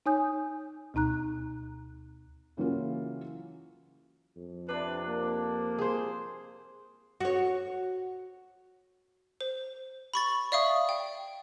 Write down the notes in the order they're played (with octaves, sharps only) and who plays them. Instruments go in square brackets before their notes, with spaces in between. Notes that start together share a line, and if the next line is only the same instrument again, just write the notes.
[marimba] D#4 C#5 G#5 D#6 G6
D2 B2 D#4 A#5 F#6
[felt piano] C#3 E3 F#3 A#3 F4
[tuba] F2
[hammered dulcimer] C3 D4 [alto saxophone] B4
[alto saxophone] A#3
[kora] G#4 C5
[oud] F#4 C#5
[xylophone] C5
B5 C#6 A6
D5 E5 F5 C#6 D#6
G5